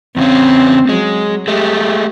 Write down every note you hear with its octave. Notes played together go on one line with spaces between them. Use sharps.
E2 C#3 C4 C#4
F#3 G#3
G#3 A3 G4